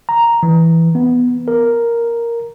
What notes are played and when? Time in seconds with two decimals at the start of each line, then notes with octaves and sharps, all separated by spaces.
0.09 A#5
0.43 E3
0.95 B3
1.48 A#4